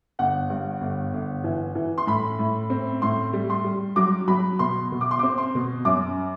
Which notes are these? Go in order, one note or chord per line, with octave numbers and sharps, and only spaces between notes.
G1 F#5
G2
G1
G1
E3
E3
C6
A2 B5
A2
C4
A2 C6
G3
C6
G3
F#3 D6
F#3 B5
B2 C6
B2
D6
C6
C4 D6
C6
B2
F#2 D6